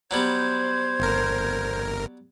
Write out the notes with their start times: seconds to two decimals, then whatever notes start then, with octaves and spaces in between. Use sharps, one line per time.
0.11 F#3 G3 B3 C5 G#6
1.00 G1 A#4